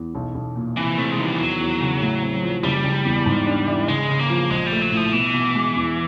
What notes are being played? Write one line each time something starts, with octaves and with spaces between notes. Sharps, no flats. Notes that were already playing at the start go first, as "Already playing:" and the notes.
Already playing: E2
B1
B1
A#2
C3 E3
A3 C4
G#3
D#3
G3
E2 F#3
E2
C#3
A2
C4
F3
F#1 G3
F#1
E2
G#2
D4
E3
C#3 G#3
C#3
A#3
F3
A#1 G#3
G3 A3
F#3
A2 F3
B2 E3
B2
G#3
E2